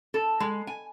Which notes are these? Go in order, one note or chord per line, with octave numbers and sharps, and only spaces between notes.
A4
G#3
G#5